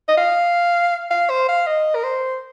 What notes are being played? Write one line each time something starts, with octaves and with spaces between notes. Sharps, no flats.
D#5
F5
F5
C5
F5
D#5
A#4
C5